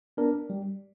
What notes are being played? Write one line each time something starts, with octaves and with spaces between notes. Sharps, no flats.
B3 D4 A#4
G3